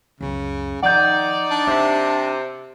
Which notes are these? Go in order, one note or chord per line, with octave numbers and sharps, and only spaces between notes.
C#2 F#2 C#3
D#3 F3 D#4 D5 F#5 G6
D4
C3 D#4